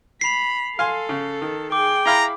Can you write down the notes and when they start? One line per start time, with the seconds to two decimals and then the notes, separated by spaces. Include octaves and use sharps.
0.21 B5 C7 F7
0.79 A4 F5 G#5 C6
1.09 C#3
1.42 D#3
1.72 G#4 G5 D6
2.06 E4 F5 A#5 B5